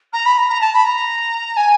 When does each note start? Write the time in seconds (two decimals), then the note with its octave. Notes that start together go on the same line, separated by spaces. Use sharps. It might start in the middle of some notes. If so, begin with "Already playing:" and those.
0.13 A#5
0.25 B5
0.38 A#5
0.49 A#5
0.61 A5
0.73 B5
0.84 A#5
1.56 G#5